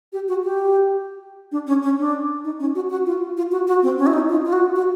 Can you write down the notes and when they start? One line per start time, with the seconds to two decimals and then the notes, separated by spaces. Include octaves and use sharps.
0.13 G4
0.28 F#4
0.43 G4
1.52 D4
1.67 C#4
1.82 C#4
1.98 D4
2.44 D#4
2.59 C#4
2.75 F#4
2.90 F#4
3.06 F4
3.37 F4
3.52 F#4
3.67 F#4
3.83 C4
3.98 C#4
4.06 E4
4.13 D#4
4.29 F4
4.45 F4
4.52 F#4
4.75 F#4